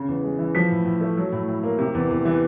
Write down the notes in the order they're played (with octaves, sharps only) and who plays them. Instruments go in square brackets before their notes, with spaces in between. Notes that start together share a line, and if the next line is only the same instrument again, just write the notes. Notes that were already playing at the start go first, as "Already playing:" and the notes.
Already playing: [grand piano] C#3
E2
G#3
E3
F3 B6
A2
A2
A3
F#3
A2
A2
A#3
C3
E2
E2
E3